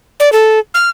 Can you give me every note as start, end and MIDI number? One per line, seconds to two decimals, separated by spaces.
0.20 0.32 74
0.33 0.59 69
0.74 0.90 89